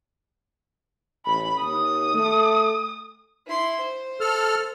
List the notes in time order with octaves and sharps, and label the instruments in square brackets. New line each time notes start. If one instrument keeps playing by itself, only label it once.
[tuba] A1 [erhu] B5
[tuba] D#2 [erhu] D#6
[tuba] A3
[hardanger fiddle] E4 C6
C5
[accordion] A4 F6